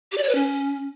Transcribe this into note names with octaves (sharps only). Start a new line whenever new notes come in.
G4
D5
C#5
B4
C#4